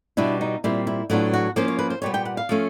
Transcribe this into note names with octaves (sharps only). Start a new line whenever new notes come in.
B2 G3 B3 D4 E4
D#4
A#2 G3 C4 E4
E4
A2 F#3 B3 D4 F4
F#4
F3 A#3 C#4 C5
C#5
B4
C5
A#2 G3 B3 C#5
G5
F#5
F5
F3 A3 C#4